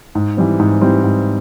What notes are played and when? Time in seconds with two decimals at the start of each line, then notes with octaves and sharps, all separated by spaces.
0.15 G#2
0.37 E3 G3 C4
0.60 G#2
0.81 E3 G3 C4
1.04 G#2